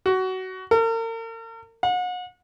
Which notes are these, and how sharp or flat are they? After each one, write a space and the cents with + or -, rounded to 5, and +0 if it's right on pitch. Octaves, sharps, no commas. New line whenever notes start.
F#4 +20
A#4 -40
F#5 -35